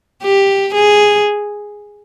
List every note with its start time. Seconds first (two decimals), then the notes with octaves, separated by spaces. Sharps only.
0.23 G4
0.74 G#4